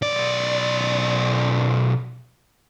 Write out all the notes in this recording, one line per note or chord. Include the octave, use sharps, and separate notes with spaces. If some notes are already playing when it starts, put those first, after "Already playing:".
B1 D5